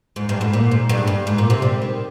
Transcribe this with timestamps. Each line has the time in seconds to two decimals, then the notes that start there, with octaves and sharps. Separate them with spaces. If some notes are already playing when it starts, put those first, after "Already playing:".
0.16 G#2
0.29 G2
0.41 G#2
0.53 A#2
0.71 G#2
0.89 G2
1.07 G2
1.27 G#2
1.38 A#2
1.50 C3
1.62 G3
1.82 D#3